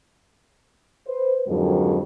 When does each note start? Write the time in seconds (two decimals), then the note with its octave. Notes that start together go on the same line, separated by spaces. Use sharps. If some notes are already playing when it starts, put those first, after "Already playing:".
1.07 B4 C5
1.48 F2 G#2 D3 F#3 G3 A#4